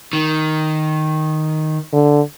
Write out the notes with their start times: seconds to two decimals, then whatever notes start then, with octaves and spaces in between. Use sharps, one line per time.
0.13 D#3
1.93 D3